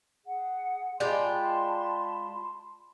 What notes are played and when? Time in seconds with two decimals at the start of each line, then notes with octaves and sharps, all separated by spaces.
0.25 G#4 F#5
1.00 G#3 F4 D5 G5 A5 B5 C6